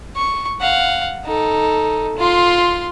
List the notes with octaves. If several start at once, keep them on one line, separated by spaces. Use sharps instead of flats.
C#6
F5 F#5
D#4 A4
F4 C6